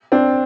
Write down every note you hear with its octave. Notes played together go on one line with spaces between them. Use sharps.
C4 D4